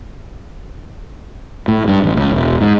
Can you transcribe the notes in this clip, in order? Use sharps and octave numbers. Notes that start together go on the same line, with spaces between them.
A2
G2
A1
C#2
E1
G#2